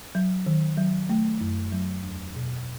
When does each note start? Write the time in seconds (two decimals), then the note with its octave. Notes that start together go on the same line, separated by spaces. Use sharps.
0.15 F#3
0.46 D#3
0.78 F#3
1.09 A3
1.41 F#2
1.72 F#3
2.03 E2
2.35 B2